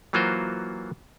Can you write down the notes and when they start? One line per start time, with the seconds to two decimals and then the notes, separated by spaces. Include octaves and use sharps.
0.13 E3 F#3 A#3 F4 F#4 C5